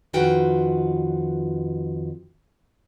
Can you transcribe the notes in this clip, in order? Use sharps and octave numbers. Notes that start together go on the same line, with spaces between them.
F2 D#3 F4 F#4 B4 G5